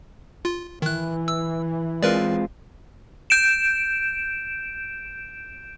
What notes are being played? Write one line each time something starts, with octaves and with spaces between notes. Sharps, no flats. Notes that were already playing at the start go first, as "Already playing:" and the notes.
F4
D#3 E3 F#6
E6
G#3 C4 F4 A#4 B4 D5
G6 D7 E7